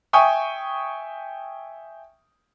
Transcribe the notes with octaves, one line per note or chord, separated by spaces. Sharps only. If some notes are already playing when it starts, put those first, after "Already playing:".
E5 G5 G#5 C#6 D#6